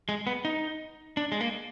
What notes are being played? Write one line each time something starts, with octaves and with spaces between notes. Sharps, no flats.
G#3
B3
D#4
D4
G#3
A#3